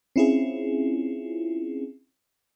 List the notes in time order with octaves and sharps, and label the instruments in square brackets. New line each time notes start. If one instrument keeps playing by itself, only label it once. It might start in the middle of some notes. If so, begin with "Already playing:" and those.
[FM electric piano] C4 C#4 E4 F4 G#4